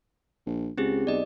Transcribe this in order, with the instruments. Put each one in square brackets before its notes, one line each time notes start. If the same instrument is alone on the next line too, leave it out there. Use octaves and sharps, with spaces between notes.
[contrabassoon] A#1
[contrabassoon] C#2 [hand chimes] C4 G4 G#4
[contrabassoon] B1 [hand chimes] D5 D#5